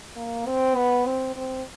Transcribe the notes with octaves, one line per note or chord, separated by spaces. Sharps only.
A#3
C4
B3
C4
C4